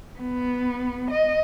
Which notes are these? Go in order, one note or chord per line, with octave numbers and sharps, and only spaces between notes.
B3
D#5